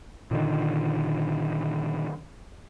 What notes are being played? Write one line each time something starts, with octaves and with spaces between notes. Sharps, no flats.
A#2 D3 D#3